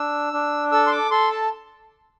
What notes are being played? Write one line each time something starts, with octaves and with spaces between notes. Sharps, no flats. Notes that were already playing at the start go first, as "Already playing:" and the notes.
Already playing: D4 E6
D4
A4 E6
C6
D6
A4 C6
A5